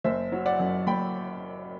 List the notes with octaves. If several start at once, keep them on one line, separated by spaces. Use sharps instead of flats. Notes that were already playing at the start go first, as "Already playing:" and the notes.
F#1 C5 E5
F#3
D5 F#5
F#2
F#1 G5 B5